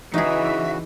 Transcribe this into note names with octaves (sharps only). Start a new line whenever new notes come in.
C#3 E3 D#4 F#4 G#4 E5